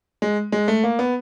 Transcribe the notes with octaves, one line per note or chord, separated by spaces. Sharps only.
G#3
G#3
A3
A#3
B3